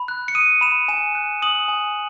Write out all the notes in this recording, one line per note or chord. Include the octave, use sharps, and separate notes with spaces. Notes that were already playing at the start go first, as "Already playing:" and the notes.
Already playing: B5
F#6
C#7
D#6 D#7
B5 E7
G#5 E7
F#6
D#6 F#7
G#5